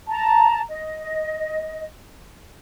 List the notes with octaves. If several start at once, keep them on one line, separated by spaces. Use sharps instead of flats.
A5 A#5
D#5